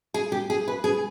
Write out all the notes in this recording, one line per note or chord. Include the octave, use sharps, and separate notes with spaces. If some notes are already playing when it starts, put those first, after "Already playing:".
G#4
G4
G#4
B4
G#4